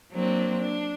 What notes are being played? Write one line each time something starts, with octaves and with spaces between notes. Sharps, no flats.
F#3 A#3 C4 D4
D4